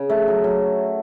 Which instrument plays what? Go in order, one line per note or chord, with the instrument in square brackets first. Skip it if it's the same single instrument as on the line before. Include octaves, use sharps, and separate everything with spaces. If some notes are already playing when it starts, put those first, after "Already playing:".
Already playing: [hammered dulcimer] C#3
A3
F#3
F#3